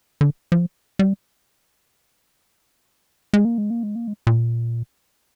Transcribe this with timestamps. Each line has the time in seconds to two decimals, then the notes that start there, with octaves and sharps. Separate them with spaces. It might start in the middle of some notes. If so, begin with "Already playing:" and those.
0.21 D3
0.52 F3
0.99 G3
3.33 G#3
3.45 A#3
3.58 G#3
3.70 A#3
3.83 G#3
3.96 A#3
4.08 G#3
4.27 A#2